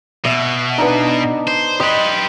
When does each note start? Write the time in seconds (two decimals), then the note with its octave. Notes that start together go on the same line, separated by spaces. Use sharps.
0.25 B2 E5
0.78 B3 D4 D#4
1.47 C5
1.80 G4 B4 C5 D#5 C6